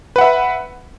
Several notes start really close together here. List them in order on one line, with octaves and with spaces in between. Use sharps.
B4 F#5 E5 B5